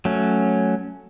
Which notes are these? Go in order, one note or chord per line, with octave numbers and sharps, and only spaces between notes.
F#3 A3 C#4